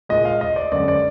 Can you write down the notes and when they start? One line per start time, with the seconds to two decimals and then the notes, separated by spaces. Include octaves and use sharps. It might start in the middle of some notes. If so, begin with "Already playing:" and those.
0.09 A#2 G#3 D#5
0.25 F5
0.41 D#5
0.56 D5
0.72 F#2 D3 G#3 D5
0.88 D5